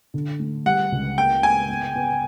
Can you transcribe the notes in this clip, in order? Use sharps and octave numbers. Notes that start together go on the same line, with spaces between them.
D3
A3
G3 F#5
C#2
A#3 G5
A#3 G#5
B3
B3